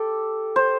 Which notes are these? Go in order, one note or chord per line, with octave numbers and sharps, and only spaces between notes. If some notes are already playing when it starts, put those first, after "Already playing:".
Already playing: G4 A4
C5